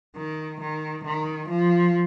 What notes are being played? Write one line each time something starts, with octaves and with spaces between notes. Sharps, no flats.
D#3
D#3
D#3
F3